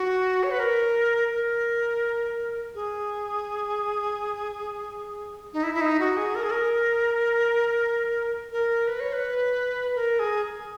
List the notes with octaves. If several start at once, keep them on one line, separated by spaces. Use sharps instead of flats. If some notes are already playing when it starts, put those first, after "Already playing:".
Already playing: F#4
C#5
B4
A#4
A#4
G#4
D#4
E4
E4
D#4
F#4
G#4
A#4
G#4
A#4
A#4
B4
C#5
B4
A#4
G#4